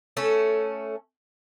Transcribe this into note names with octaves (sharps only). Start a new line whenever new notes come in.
A3 C#4 A4